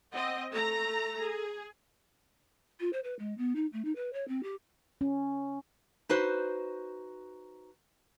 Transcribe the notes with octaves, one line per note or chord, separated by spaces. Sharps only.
C4 D#5 F#5
A3 A4 A#5
G#4
F4
C5
B4
G#3
B3
D#4
A3
D#4
B4
C#5
C4
G4
C#4
D#4 F#4 B4 C5